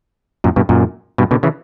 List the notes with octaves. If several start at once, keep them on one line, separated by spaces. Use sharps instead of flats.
F#2 A#2
G2 B2
F#2 A#2
G2 B2
B2 D3
C#3 E3